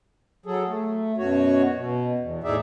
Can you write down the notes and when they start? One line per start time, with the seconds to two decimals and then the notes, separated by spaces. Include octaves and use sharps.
0.46 F#3 G#4 A4
0.66 A3
1.17 F#2 B2 F#4 C#5
1.75 B2
2.19 E2
2.44 A2 D#4 G#4 D5 E5